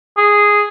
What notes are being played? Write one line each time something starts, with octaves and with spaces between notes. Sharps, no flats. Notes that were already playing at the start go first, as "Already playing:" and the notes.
G#4